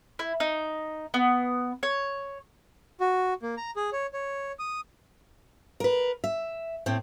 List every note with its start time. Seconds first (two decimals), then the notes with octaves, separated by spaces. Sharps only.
0.19 E4
0.40 D#4
1.14 B3
1.83 C#5
3.00 F#4
3.42 A#3
3.57 A#5
3.76 G#4
3.93 C#5
4.13 C#5
4.59 D#6
5.80 A#4 B4
6.24 E5
6.86 A2 C4